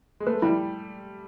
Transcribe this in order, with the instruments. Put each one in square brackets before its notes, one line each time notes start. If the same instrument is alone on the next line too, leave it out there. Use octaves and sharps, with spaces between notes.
[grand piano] G#3
[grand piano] A3 [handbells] B4
[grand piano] G3 [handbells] E4